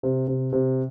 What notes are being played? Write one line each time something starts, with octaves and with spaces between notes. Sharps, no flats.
C3
C3
C3